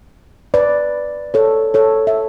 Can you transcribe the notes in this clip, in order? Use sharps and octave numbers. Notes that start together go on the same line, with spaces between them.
B4 D5
A4 C#5
A4 C#5
E5